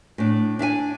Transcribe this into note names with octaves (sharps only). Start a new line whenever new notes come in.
A2 D4
D4 E5 F5 G#5